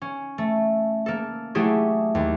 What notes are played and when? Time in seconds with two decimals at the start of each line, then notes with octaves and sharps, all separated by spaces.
0.02 C#4
0.38 A3
1.06 A#3 A4
1.55 F#3 A3 E4 G4 G#4
2.15 D#2